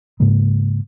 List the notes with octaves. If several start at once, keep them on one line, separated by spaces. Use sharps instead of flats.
G#2 C#3 G#3 A#3